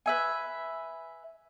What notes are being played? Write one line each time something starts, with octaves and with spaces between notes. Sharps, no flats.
B4 E5 G#5